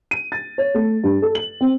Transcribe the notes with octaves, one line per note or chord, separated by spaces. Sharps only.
D#7
A6
C#5
A3
G2
A4
F#7
C4